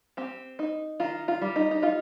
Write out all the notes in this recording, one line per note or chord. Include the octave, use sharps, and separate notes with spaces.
C4 G4
D#4
D#3 F4
F4
G3
D#4
D#4
D#4 F4